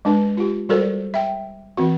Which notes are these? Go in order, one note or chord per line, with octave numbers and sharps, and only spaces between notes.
G#3 D4 B4
F4 G4
G3 F#4 A4 A#4 C5 D5
E5 G5
E3 C4 F#4